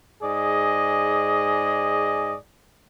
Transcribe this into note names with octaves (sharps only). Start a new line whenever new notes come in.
G#2 G#4 D5 D#5